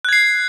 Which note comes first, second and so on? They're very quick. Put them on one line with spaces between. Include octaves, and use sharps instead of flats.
F#6 G#6 C7